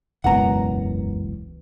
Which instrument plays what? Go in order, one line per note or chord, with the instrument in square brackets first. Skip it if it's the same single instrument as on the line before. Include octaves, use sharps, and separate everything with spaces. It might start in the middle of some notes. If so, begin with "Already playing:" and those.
[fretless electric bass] E1 F#2 B3 [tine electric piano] C#2 B2 E3 [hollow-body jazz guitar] F#5 A#5